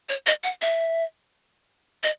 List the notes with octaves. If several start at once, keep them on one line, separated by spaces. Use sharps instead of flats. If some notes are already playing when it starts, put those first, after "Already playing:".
C#5
D#5
F#5
E5
D#5